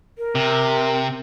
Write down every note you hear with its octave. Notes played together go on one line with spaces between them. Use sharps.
A#4
C3